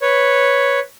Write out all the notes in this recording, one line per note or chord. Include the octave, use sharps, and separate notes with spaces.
B4 C#5